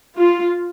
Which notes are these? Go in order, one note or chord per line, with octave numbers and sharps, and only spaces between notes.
F4